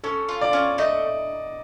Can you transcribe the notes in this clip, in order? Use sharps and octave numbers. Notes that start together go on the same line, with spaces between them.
C#4 A4
F4
D5
C#4
A3 D#5